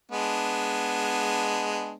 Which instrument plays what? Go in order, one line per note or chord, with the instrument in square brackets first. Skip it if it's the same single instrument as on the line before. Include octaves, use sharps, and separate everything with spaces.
[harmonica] G#3 B3 D4